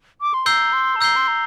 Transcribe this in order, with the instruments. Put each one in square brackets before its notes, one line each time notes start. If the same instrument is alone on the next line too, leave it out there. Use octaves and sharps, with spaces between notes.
[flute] D6
C6
[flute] A#5 [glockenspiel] E6 G6 C7 G7
[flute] C6
A5
[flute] A#5 [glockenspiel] E6 G6 C7 G7
[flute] C6
A#5